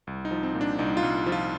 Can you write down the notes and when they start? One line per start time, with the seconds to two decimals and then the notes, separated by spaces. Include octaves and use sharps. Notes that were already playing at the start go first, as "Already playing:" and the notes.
0.07 C2
0.25 D#4
0.31 F3
0.43 C4
0.55 A#2
0.61 D4
0.79 C2 D#4
0.97 F4
1.03 C2
1.26 F3
1.32 F4